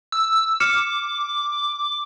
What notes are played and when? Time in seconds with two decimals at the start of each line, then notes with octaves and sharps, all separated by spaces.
0.12 E6
0.60 D6 F6 C#7 E7